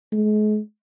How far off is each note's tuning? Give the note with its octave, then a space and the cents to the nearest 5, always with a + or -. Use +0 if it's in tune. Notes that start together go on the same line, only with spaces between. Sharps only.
G#3 +40